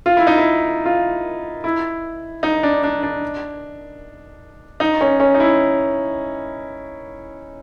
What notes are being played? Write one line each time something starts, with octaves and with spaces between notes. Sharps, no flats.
F4
E4
D#4
E4
F4
E4
D#4
D4
D4
D4
D#4
C#4
C#4
D#4
E4